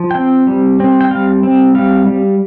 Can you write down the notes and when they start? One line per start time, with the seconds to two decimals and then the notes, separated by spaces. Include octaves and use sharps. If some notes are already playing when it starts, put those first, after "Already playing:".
Already playing: F3
0.11 C4 G5
0.47 G3
0.80 C4
1.01 G5
1.11 G3 F5
1.43 C4
1.75 G3 F5
2.07 G3